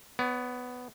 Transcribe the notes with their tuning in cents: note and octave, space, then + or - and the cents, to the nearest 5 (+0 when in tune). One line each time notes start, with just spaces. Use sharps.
B3 +10 C#5 +45